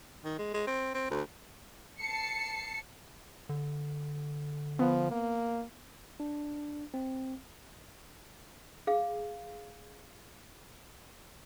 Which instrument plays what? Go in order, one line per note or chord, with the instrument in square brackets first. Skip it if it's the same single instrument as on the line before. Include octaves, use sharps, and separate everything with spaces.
[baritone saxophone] D#3
G#3
G#3
C4
C4
D2
[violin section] A5 C7 C#7
[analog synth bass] D3
[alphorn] F3 [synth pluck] B3
[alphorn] A#3
[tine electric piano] D4
C4
[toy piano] G#4 F5